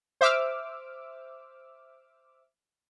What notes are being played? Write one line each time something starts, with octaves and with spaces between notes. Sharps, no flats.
C5 E5 D6 E6 F6